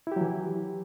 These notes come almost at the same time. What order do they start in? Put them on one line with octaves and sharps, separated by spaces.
E4 G4 F#3 E3